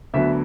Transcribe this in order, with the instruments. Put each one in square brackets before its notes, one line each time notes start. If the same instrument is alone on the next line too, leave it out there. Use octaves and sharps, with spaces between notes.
[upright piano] D2 D3 F#3 B3 E5